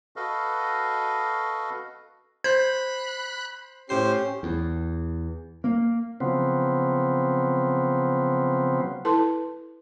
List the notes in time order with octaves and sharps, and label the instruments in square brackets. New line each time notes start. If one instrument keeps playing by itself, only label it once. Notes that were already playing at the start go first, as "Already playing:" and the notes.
[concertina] F#4 A4 B4 D#5 F5
[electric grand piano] C5 [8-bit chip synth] B5 F#6 [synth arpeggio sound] G6
[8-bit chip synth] A2 C5 C7 [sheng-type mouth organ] C#4 G4
[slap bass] E2
A#3
[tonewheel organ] C#3 F3 F#3 B3 C4
[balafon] E4 A4 B4 A5 C6